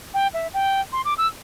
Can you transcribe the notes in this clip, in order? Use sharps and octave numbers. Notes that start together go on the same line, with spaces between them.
G5
E5
G5
C6
D6
E6